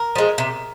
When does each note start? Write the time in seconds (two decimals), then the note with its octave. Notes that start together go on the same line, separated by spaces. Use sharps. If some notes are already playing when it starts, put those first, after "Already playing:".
Already playing: A#4
0.15 F3 G#3
0.38 C3